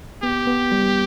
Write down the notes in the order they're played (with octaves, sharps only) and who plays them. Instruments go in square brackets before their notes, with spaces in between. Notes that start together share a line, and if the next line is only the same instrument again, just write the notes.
[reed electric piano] B3 [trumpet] G4
[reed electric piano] B3
G3